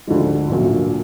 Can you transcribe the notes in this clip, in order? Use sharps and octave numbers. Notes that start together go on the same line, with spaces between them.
D2 D3 F3 G#3
A#1 A#2 F#3